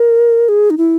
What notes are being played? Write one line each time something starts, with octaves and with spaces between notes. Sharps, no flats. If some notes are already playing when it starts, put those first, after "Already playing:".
Already playing: A#4
G#4
D#4
E4